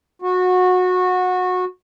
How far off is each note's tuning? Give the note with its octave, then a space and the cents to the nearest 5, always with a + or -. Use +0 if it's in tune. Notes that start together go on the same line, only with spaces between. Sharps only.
F#4 -20